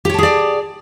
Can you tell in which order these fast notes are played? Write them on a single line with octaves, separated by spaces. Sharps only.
G4 C#5 A5 G#4 D5